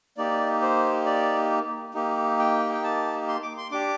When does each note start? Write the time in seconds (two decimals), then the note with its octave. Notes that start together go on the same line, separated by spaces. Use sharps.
0.17 A#3 D#4 G4 D5
0.62 C5
1.06 D5
1.94 A#3 D#4 G4
2.39 G5
2.73 G5
2.84 A5
3.28 C6
3.43 D6
3.57 C6
3.71 D4 G4 D6